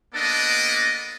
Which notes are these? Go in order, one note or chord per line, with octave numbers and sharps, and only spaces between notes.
A#3 B3 D4 A4 D5 D#5